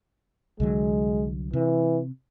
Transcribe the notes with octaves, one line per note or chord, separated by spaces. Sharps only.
C2 D3 F#3 G#3
C3 E3